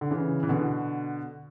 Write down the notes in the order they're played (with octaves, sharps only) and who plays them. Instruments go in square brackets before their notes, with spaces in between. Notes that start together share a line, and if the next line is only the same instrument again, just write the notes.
[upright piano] D3
C#3 E3
E3
B2 D3